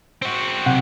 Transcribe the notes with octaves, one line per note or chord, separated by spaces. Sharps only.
C4 F#4
B1 C3 F#5